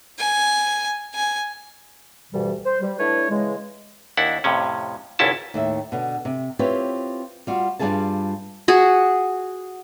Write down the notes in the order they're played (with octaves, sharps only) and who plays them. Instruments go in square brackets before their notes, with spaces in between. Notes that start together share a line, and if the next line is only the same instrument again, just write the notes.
[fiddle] G#5
G#5
[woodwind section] D2 G2 B2 E3 G3
C5
G3
A3 D4 E4 B4 C#5
C#3 E3 G#3
[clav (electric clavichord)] D#2 D4 E4 F#5
F2 A2 C3 C#4
G#1 C#2 G#2 C#4 E4 A5
[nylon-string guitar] D#2 A2 E5
B2 D3
C3
C4 E4 F4 G4 B4 C#5
G3 F4 F#4
G2 E3 G3 F4 G#4 A5
[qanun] F#4 G#4